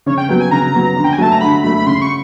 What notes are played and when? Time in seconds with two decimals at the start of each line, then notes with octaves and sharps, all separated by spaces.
0.06 C#3 C#5
0.18 G5
0.29 F#3 B3 G5
0.40 G#5
0.51 C#3 A#5
0.74 F#3 B3
0.97 D3
1.04 G5
1.13 G#5
1.18 F#3 A3 A5
1.32 A#5
1.41 D3 B5
1.64 F#3 A3 B5
1.76 B5
1.87 C#3 C6
2.02 C#6